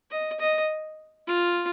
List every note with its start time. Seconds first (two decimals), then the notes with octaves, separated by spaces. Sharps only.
0.11 D#5
0.40 D#5
1.27 F4